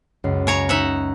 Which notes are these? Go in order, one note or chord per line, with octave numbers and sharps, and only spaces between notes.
C#2 F#2 C7
C#3 C#5 A#5
D#4 E5 F#5